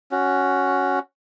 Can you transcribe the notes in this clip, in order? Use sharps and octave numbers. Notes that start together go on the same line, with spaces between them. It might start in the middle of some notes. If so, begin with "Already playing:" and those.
C#4 F#4